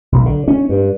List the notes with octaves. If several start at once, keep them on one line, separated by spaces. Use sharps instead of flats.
B1
D3
C#4
G2